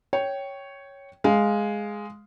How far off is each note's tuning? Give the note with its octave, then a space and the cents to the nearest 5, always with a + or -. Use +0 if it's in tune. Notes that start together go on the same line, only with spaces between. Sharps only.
C#5 +0 G5 -10
G#3 +0 F5 +0